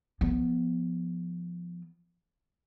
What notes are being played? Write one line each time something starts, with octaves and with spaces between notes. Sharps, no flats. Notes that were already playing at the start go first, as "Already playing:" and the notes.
F3 B3